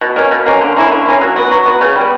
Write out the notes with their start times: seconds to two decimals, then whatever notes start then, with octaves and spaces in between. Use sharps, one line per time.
0.01 B2
0.16 A#3 C#4
0.31 B2
0.46 A#3 C#4
0.61 D3
0.76 A#3 C#4 E4
0.91 D3
1.06 A#3 C#4 E4
1.21 F#3
1.36 B3 F#4
1.51 F#3
1.66 B3 F#4
1.81 C#3
1.96 G3
2.01 B3